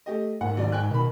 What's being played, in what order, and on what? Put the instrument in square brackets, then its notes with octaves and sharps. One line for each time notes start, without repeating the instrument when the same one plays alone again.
[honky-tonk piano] A3 G4 D#5
[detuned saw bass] G#2 [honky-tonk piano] A#3 F#5
[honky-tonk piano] D#2 F#3 D5
G5 G#5 F#6
[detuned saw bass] B2 [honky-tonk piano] D#3 B5